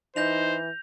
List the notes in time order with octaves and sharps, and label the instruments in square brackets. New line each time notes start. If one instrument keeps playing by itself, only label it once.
[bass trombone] E3 [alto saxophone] D#4 [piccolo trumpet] C5 [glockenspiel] G6 A#6 F7